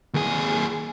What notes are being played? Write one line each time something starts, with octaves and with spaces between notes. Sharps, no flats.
D#2 G#4